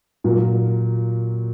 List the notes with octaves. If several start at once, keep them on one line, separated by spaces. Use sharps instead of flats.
A#2 F#3 A#3